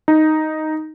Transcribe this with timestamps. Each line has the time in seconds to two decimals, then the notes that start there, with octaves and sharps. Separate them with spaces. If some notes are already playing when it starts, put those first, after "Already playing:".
0.08 D#4